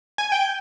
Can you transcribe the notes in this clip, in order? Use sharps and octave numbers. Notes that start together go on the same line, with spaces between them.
G#5
G5